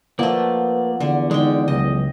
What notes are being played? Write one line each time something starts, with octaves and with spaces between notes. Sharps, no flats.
F3 A3 A#3 B4 D5 F#5
E2 D3
D3 G#3 D#4 G5
C#2 F#3 D#5